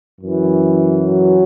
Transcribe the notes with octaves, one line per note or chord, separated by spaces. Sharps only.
F#2 E3
F#3